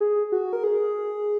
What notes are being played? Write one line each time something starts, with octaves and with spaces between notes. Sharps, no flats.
G#4
F#4
A#4
G#4